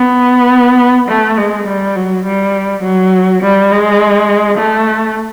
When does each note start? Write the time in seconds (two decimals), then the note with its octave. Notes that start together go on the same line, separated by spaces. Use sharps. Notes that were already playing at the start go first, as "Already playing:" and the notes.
Already playing: B3
1.09 A3
1.37 G#3
1.67 G3
1.95 F#3
2.26 G3
2.83 F#3
3.42 G3
3.71 G#3
4.57 A3